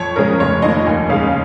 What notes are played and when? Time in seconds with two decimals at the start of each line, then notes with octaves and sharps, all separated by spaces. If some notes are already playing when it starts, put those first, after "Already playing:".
Already playing: F2 C#5
0.16 C#3 G#3 C#4 A#4
0.40 F1 C#5
0.62 F2 D#3 A#3 D#5
0.86 D#2 G#5
1.09 C#3 G#3 F5